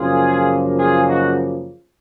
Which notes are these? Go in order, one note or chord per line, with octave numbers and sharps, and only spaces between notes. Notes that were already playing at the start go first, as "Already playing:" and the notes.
Already playing: F#2 C#3 F3 A#3 F4 G#4
F4 G#4
D#4 F#4